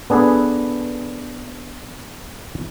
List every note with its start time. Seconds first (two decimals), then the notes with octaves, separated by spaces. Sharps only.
0.10 B3 D4 G#4 A4 B4